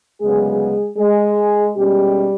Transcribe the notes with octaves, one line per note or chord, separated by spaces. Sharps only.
D2 C#3 F#3 G#3 B3 G#4
G#3 G#4
B2 G3 G#3 C#4 G4